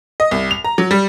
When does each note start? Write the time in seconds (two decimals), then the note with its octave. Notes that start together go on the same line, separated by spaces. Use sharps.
0.20 D#5
0.31 C2
0.51 F7
0.65 A#5
0.78 F#3
0.91 G3